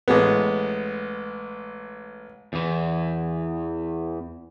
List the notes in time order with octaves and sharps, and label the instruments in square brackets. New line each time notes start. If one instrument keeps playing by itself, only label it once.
[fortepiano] A1 G#3 B3
[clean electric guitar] E2 E3